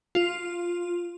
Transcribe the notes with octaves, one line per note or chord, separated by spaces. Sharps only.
F4